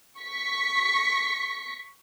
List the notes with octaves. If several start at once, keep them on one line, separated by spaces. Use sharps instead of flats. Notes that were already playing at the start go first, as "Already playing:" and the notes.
C#6 B6